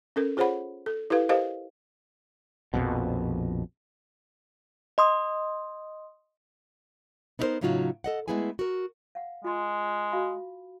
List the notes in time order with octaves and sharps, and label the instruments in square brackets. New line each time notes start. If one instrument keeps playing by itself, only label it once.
[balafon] C#4 A4 A#4
F4 G#4 C5 C#5 F#5 B5
A4
E4 G4 A4 B4 F5
G4 A#4 C5 D#5 F5
[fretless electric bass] A#1 F2 B2
[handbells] D#5 C6 D#6
[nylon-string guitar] B3 D#4 E4 A4 A#4 C5
A2 C#3 F#3 D#4 F4 F#4
A4 D#5 F#5
G#3 A3 B3 E4 G#4 G#5
F#4 A#4
[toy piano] F5 F#5
[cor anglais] G#3 [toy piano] F4 C6
[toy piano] F#4 F5 B5